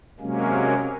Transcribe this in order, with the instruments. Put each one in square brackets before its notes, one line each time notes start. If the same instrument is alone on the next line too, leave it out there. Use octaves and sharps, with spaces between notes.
[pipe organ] C3 F#3 G#3 A#3 C#4